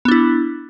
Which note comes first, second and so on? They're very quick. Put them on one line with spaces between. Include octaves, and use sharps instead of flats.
B3 D4 E4